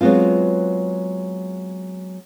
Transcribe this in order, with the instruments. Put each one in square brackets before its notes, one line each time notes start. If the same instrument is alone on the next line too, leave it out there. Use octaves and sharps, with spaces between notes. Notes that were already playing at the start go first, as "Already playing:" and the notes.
[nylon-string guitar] F#3 G#3 B3 C4 F4